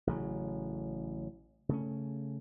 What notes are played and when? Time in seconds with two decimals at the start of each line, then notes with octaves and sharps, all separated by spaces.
0.07 A1 C#3 F#3
1.69 C#3 A3 C#4